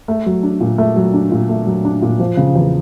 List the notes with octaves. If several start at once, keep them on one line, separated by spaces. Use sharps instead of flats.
A3
F#3
D4
A#2
A3
F#3
D4
A#2
A3
F#3
D4
A#2
F3
C#3
E2